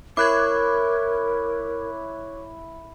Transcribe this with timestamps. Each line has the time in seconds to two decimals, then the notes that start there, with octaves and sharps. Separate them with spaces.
0.17 E4 A#4 C#5 C#6 D6 F#6 G#6